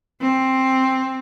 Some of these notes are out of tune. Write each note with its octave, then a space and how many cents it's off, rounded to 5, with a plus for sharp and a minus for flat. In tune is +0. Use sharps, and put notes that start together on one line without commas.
C4 +10